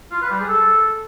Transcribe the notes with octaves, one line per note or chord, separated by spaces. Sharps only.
F4
B4
G3
G#4
A4